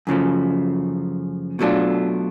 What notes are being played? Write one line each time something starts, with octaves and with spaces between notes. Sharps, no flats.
F#2 C#3 F3 A3
B2 F#3 A3 D4 F4